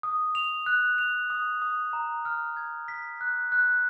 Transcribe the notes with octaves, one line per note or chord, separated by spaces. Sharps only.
D#6
F7
F#6
F7
D#6
D#6
A#5
F6
G#6
B6
F#6
F#6